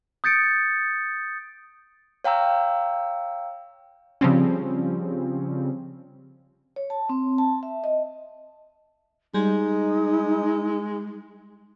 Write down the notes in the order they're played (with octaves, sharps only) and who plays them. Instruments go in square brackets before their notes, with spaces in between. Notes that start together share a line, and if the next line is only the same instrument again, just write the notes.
[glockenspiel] D#6 G6 A6 C#7 D7
[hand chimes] C#5 F5 G5 A#5 E6
[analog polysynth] C#3 F3 G3 C4 C#4
[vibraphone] C#5
A5
C4
A5
E5
D#5
[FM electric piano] G3 [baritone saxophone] G#3 [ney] D#4